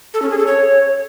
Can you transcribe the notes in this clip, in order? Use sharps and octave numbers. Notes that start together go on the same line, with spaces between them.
A4
C#4
G#4
A4
C#5